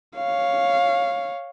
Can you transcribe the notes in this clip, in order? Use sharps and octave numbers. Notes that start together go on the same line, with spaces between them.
C#5 F5